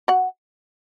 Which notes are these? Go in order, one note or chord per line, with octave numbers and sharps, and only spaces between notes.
F#4 F#5